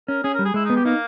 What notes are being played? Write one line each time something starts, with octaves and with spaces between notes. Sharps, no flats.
C#4 A#4
C#4 G#4
A#4
G3
G#4
G#3 E4
D#4
B3
G4
A#3 D#4